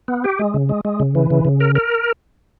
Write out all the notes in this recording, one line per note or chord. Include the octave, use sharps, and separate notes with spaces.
B3
G4
G#3
C#3
G#3
G#3
C#3
E3
C#3
C#3
A#4
A#4